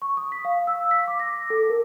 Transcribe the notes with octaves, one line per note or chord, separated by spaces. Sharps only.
C#6
D#6
B6
F5
E6
B6
D6
A#6
A4
A#4